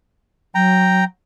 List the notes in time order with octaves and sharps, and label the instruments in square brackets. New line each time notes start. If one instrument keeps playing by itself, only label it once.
[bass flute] F#3 [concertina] G5 A#5